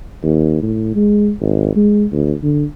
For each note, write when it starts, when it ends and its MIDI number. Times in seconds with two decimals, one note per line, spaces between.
0.23 0.62 39
0.63 0.95 45
0.95 1.32 56
1.41 1.74 32
1.76 2.05 56
2.12 2.33 38
2.43 2.64 50